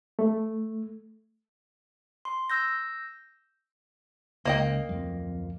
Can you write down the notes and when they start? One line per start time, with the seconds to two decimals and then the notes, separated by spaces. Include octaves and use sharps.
0.19 A3
2.25 C6
2.50 E6 G6 A#6
4.45 C#2 A#3 D#5 G5
4.89 D1 F2